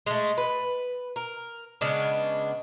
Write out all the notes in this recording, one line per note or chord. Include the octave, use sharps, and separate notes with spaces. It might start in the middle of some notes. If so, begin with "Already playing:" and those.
G#3 A3
B4
A#4
C#3 G#3 B3 D4